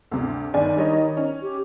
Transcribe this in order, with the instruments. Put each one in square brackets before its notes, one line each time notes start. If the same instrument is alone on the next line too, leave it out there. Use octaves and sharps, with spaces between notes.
[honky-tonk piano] D2 G2 C3
[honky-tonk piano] G1 D5 G#5 [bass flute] D#3
[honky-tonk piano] G3 C#5 D#5
C#4
[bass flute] G4